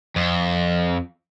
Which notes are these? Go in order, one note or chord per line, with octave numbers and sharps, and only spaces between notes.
F2